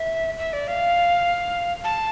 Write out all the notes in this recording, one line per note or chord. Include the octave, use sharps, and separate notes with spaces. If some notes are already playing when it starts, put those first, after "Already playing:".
Already playing: E5
E5
D5
F5
A5